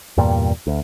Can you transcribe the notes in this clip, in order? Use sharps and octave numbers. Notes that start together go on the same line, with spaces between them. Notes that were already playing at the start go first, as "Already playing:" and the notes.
E2 G2 A#2 G3
D2